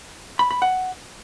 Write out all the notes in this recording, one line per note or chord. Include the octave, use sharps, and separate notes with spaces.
B5
B5
F#5